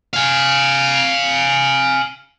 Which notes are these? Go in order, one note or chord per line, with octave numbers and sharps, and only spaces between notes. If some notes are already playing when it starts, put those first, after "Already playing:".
F5 G#5